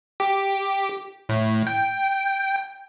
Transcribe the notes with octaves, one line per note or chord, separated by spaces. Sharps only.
G4
A2
G5